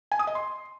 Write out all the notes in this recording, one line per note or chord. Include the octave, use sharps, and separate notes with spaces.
G#5
D#6
D#5
C6